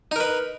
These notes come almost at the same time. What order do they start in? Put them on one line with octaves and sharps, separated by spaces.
D#4 A#4 B4